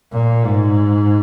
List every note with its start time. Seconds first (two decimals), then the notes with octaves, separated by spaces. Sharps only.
0.12 A#2
0.44 G#2